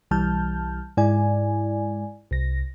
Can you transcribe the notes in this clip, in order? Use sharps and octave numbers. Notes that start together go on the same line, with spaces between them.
B1 E3 G3 A5 F6 G6
G#2 G#3 E4 D5 G#5
C2 A#6